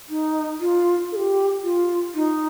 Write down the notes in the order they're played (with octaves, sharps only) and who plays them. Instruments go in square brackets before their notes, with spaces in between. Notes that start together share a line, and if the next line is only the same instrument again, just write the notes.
[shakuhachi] D#4
F4
A4
G4
F4
D#4